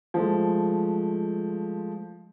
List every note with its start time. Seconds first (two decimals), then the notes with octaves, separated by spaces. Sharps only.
0.14 F3 G#3 A3